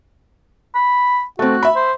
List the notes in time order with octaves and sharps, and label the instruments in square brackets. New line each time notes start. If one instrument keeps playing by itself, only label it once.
[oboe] B5
[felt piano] A3 C4 [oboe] F#4
[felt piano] E5 B5
[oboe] C5